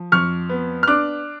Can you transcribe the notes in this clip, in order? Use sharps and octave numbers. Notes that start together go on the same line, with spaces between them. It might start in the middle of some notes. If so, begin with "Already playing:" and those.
Already playing: F3
F2 C#6 F6
B3
F6
D4 D6 F#6